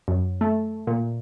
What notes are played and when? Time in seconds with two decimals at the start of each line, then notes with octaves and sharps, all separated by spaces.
0.08 F#2
0.41 A3
0.87 A#2